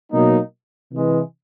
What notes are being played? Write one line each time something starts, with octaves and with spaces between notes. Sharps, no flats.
B2 F#3 A#3 D#4
C3 E3 G#3